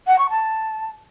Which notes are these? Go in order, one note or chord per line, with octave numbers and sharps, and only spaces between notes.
F#5
C#6
A5